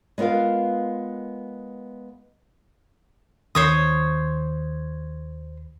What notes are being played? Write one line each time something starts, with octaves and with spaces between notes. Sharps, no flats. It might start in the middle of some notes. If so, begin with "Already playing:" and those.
G#3 B3 F4 A#4 F5
D#2 D#3 C5 C#5 D#6